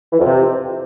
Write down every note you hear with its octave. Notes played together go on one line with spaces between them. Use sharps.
E3
F2
C3